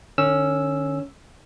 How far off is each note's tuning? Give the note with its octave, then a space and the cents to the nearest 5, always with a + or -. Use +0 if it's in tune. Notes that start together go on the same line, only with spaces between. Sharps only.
D3 +45 C#4 +0 E6 +0